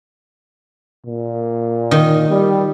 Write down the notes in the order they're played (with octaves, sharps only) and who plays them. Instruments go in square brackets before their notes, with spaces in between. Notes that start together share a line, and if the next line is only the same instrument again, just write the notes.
[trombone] A#2
[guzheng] D#3
[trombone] G3